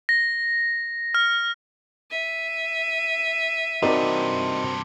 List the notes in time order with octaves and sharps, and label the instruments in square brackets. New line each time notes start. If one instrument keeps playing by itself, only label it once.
[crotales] A#6
F6
[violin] E5 D#7
[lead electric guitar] G2 C3 [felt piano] C4 F#4 A#4 [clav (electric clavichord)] D#4 D5